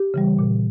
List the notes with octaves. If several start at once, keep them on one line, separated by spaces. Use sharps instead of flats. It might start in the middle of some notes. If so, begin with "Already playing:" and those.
Already playing: G4
C#3 E3 G3
A#2